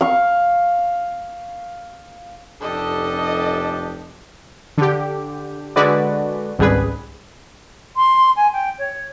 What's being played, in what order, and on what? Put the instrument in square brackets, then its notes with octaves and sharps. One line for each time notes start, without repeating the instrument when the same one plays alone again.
[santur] F5 C#6
[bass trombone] F1 [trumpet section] D4 G4 A4 [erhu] D#5
[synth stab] D3 G4
D3 G#3 F#4 B4 D5
G#1 C#2 G3 G#4 B4
[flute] C6
G#5
G5
C#5